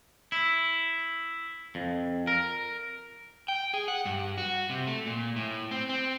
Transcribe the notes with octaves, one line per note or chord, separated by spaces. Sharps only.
E4
F2
A#4
G5
G#4
F#5
G2
F#4
C3
A3
A#2
A2
C4
C4